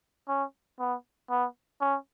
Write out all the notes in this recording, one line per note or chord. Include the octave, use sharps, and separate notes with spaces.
C#4
B3
B3
C#4